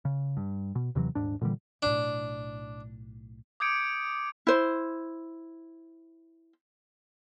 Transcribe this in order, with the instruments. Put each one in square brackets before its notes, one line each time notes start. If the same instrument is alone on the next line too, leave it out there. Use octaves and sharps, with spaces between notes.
[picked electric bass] C#3
G2
B2
D#2 C3 E3 F#3
D#1 G#2 D4
A#2 D3 E3 G3
[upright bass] B1 A2 [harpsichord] D4
[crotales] D6 D#6 G6 G#6 C#7 D7
[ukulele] E4 C5